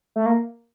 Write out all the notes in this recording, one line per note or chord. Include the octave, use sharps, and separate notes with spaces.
A3
A#3